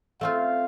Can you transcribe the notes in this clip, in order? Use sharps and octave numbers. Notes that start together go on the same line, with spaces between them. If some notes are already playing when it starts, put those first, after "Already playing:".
A3 C4 F4 F5